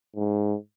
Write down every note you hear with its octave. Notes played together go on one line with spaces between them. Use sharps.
G#2